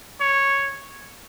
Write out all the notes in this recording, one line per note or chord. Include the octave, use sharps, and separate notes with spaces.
C#5